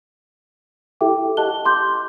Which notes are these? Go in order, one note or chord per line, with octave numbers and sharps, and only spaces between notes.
E4 G4 A4 E5 G5 D6
G4 D#5 F#5 A5 F#6 G7
C6 D6 G6